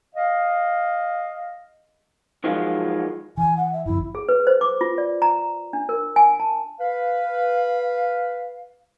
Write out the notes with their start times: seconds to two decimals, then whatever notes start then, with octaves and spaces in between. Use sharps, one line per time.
0.15 D#5 F5
2.44 D#3 F3 F#3 G#3 F4
3.38 E3 G#5
3.57 F#5
3.73 E5
3.86 G1 F2 E4
4.15 G#4
4.29 B4
4.47 C5
4.61 D6
4.81 F4
4.98 D5
5.22 A#5
5.73 D4
5.89 A#4
6.16 G#5
6.40 A5
6.78 B4 F5